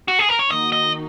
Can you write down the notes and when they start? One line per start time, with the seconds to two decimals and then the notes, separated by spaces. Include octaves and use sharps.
0.08 F#4
0.19 G#4
0.29 A#4
0.39 C#5
0.50 D#3 A#3 D#4 F#4 D#5
0.72 D#5